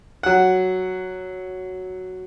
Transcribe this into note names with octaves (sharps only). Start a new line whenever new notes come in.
F#3 F#5